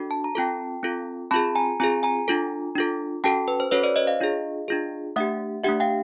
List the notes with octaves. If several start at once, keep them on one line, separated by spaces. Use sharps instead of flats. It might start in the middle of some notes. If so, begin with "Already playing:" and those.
Already playing: D4 F#4 A4
A5
A#5
C4 F4 A4 G5 A5
C4 F4 A4
C4 F4 G#4 A5 B5
G#5 A#5
C4 F4 G#4 G#5 A#5
G#5 A#5
D4 F4 A4
D4 F4 A4
C#4 F#4 A4 G5 A5
B4
C5
C#4 F#4 A4 B4 C#5
C5 D5
C#5 D#5
D#5 F5
D4 F4 G#4
D4 F4 G#4
A3 D4 G4 E5 F#5
A3 D4 G4 E5 F#5
F5 G5